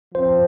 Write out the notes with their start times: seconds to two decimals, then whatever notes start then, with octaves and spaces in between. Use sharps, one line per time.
0.14 F3 C4 C5